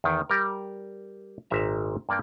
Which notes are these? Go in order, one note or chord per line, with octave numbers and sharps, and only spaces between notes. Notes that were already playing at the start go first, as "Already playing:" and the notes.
E2 D#3
G3 A#4
G#1 A#2 E5 A#5
G2 A#3 D5 G5